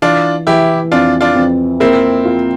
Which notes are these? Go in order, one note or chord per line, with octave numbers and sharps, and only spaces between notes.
E3 D4 F4
E3 E4 G4
F2 D4 F4
D4 F4
F2
A#3 C4 E4
F4